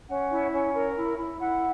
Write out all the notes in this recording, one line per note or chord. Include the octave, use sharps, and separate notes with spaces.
C#4 F#5
E4
C#4
A#4
E4
E4
E4 F#5